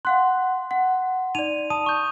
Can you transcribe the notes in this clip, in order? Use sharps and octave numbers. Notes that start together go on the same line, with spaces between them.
F5 F#5 C6 F#6
F#5
D#4 D5 D#7 F7
A5 D#6 D#7
C#6 G6